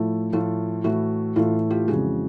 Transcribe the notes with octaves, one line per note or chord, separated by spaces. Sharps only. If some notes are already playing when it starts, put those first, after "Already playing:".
Already playing: A2 F3 A3 E4
A2 F3 A3 F4
A2 E3 A3 E4 F#4
A2 E3 A3 F4
F4 G4
F2 C#3 E3 G#3 F#4 G#4